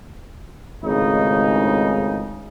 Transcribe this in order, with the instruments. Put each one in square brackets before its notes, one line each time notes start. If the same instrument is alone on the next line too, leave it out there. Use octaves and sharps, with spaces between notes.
[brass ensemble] G#1 C#2 A2 C#3 G#3 D#4